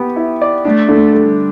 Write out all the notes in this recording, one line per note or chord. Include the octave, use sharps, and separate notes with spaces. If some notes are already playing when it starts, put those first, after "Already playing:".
Already playing: B3 G4
E4
D5
A3 D4
D3
G3 A3